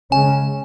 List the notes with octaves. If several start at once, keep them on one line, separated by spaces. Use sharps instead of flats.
C#3 G#3 C#4 G#5